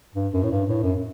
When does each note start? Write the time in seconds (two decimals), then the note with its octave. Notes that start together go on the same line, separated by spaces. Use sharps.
0.15 G2
0.33 F#2
0.43 A2
0.51 G2
0.69 A2
0.83 F#2